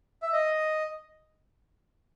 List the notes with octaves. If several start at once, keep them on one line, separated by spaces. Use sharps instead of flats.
E5
D#5